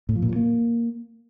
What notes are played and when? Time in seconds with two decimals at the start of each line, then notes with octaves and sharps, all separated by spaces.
0.09 A2
0.16 F3
0.22 A#2
0.29 F3
0.36 A#3